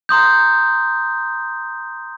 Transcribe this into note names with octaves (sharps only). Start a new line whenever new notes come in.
A#5 C6 D#6 G6